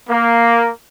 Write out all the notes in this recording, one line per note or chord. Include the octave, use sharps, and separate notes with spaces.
A#3